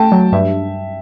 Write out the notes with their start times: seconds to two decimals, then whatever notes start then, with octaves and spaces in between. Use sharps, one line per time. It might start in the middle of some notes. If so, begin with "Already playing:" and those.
Already playing: A3 G5 A5
0.12 F#3
0.32 G2 E5